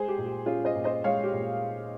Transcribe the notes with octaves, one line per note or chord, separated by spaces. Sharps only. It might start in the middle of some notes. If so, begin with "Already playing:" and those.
Already playing: G#3 G#4 C5
G4
A#2
G4
C#4 F4 G#4
C5 D#5
A#2
C5 D#5
G#3 C#5 F5
G4
A#2